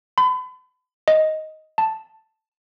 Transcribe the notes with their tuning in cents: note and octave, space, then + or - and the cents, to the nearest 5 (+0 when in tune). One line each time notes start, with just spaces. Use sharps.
B5 +40
D#5 +10
A5 +5